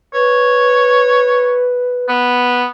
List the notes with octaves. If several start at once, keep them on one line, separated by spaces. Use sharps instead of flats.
B4 C#5
B3